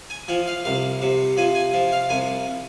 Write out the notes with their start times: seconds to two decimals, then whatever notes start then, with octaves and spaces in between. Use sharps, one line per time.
0.10 G#5
0.28 F3 G#5
0.47 F5
0.65 C2 F5
1.01 C3
1.37 F3 G#5
1.55 G#5
1.73 F3
1.92 F5
2.09 C2 G#5